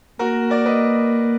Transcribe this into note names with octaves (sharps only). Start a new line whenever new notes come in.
A#3 F#4 A#4
A#4 D5
B4 D#5